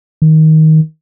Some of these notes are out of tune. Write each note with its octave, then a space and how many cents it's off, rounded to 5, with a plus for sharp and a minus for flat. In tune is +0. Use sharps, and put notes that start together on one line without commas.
D#3 +15